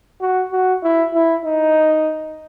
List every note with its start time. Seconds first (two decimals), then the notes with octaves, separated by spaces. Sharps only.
0.21 F#4
0.52 F#4
0.83 E4
1.14 E4
1.45 D#4